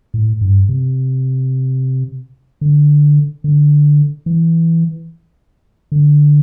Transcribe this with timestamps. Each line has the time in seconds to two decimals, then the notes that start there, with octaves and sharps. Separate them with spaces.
0.14 A2
0.41 G2
0.69 C3
2.61 D3
3.44 D3
4.26 E3
5.92 D3